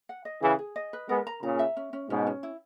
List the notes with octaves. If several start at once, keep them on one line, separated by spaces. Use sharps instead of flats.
F#5
D#5
C#3 E3 G#4
G#4
D#5
B4
G#3 B3 A#4
A#5
A#2 C#3 A#5
E5
C#4
C#4
G#2 B2 C#4
C#4
E4